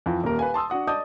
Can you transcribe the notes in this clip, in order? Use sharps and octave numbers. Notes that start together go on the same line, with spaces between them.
F2 E3 F4
D#1 A#2 A#4
B4 F5 G#5
A5 C6 D#6 E6
D4 F#4 F#5 D#6
D5 D#5 A5 D#6 G6